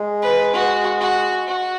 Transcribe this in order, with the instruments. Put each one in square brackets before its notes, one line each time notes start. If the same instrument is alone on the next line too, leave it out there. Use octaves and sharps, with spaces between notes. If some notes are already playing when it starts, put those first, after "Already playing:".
Already playing: [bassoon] G#3
[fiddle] B4
F#4
F#4
F#4